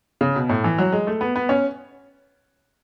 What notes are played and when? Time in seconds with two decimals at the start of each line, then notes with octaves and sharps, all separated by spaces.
0.21 C#3
0.36 B2
0.49 A2
0.64 E3
0.78 F#3
0.92 G#3
1.07 A3
1.21 B3
1.36 B3
1.49 C#4